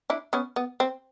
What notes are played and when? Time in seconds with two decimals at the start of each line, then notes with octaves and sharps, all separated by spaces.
0.10 D4 E4
0.33 B3 C#4
0.56 B3
0.80 C4